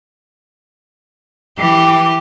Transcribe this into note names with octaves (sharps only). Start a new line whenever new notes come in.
E3 G4